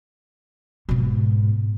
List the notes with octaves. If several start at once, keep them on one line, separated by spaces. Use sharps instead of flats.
G#2 B2